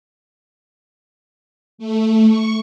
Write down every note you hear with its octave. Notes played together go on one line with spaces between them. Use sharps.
A3
C#6